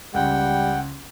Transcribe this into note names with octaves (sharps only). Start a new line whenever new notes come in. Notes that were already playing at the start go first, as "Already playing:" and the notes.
C#2 G3 F#5 G5